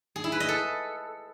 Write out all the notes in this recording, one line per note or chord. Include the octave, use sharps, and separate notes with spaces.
G#4
E4
B4
D#5
A4